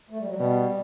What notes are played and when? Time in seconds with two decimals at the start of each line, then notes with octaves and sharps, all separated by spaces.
0.10 A3
0.18 G3
0.26 F#3
0.33 G3
0.39 B2